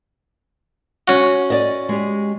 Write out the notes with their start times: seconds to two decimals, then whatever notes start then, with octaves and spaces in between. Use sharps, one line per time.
1.08 C#4 F#4
1.50 D5 D#5
1.89 G#3 G4